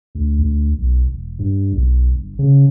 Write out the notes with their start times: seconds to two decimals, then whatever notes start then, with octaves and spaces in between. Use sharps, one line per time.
0.15 D2
0.39 D2
0.78 B1
1.08 E1
1.39 G2
1.73 B1
2.14 G1
2.39 C#3